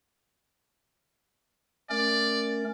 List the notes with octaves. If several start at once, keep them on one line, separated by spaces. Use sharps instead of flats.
A3 C#4 A#4 D5